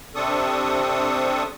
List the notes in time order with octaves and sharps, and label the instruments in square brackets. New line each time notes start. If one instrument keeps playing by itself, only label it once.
[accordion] C3 C4 D4 A4 C#6 D#6